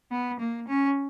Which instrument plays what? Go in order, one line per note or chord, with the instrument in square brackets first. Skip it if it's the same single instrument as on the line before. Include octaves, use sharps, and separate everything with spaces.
[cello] B3
A#3
C#4